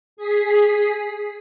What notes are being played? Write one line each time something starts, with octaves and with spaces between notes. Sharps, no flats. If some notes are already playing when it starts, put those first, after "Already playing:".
G#4 B6 C7